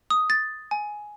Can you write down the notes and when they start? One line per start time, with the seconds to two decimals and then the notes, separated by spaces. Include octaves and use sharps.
0.10 D#6
0.30 A6
0.71 G#5